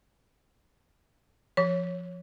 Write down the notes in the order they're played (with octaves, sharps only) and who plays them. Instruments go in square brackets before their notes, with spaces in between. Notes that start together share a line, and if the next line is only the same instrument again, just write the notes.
[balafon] F3 C#5